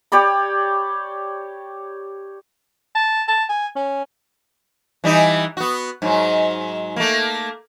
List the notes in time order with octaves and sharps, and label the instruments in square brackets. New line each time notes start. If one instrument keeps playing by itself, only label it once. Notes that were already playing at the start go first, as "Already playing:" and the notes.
[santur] G4 C#5 D5 B5
[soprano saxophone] A5
A5
G#5
C#4
[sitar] E3 G3 D#4
B3 F#4
G#2 F#3
A3 A#3